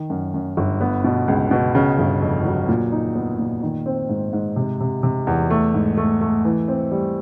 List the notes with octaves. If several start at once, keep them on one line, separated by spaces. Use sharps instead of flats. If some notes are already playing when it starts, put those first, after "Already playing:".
Already playing: D#3
F#2
F#2
G1
B3
B2
C#2
B2
C#3
G1
F2
F#3
A#2
D#4
B3
A#2
D#3
C4
G#2
G#2
C3
C3
C3
E2
A3
G#2
A3
A3
E3
C4
G3